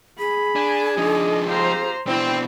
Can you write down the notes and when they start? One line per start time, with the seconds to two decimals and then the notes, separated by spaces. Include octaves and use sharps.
0.19 G#4 B5
0.56 D4 G#5
0.97 F3 D4 D#4 D#5
1.47 C4 F4 G4 C5 A#5
2.07 B2 C4 D4 E4